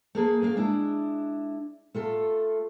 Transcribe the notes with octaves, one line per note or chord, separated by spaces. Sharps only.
A3 A#3 G#4
A#3 F4 F5
G#3 D4 E4
A3 F4 A4